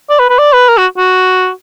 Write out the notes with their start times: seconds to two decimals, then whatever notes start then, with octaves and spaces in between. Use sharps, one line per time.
0.10 D5
0.19 B4
0.29 B4
0.39 D5
0.53 B4
0.69 A#4
0.78 F#4
0.98 F#4